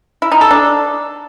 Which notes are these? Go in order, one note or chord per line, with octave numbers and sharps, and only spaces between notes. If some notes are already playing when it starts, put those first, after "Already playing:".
E4
D#4
A4
D4